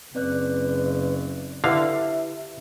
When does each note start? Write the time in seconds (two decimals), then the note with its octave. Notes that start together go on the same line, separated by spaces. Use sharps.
0.15 F#1 C4 B4 D5 F#6
1.64 D3 E4 G4 B4 E5 F5